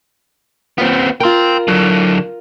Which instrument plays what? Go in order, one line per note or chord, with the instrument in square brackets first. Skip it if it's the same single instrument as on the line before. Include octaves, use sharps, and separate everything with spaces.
[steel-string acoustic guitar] D#2 F4 [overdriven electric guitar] B3 C4
[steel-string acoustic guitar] F4 A#4 [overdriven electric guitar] G5 C6
[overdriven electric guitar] D3 F#3